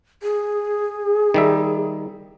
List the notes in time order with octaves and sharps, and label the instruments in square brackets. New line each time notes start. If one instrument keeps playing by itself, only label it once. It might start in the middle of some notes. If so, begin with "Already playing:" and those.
[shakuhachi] G#4
[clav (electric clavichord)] D#3 G3 E5